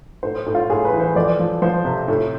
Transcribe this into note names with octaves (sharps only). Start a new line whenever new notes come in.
A2 C5
A2
F4
A2 G#4
B4
E3
C5
F2 D5
F3
F3 C5
C3
A2